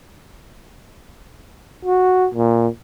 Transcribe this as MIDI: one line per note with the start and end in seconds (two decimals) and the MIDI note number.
1.85 2.28 66
2.34 2.68 46